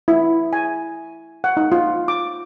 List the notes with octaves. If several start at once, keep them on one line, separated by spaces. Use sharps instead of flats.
E4
G#5
F#5
D#4
F4
D6